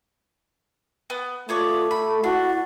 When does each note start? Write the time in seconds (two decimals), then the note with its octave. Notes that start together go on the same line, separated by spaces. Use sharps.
1.10 B3
1.49 A3 B3 F4 C#5 D5
1.91 A4 B5
2.24 D4 E4 F#4